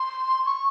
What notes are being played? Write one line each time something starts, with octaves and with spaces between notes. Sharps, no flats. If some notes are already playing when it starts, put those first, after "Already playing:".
Already playing: C6
C#6